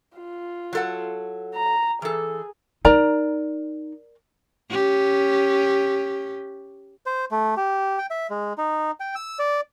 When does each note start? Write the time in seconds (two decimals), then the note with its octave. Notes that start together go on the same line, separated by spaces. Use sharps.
0.18 F4
0.73 F#3 A4 F#5
1.55 A#5
2.02 E3 G#4 A4
2.85 D#4 A#4 D5 A#5
4.70 C#4 G4
7.06 C5
7.31 A3
7.57 G4
7.98 G5
8.10 E5
8.30 G#3
8.58 D#4
9.00 G5
9.15 E6
9.39 D5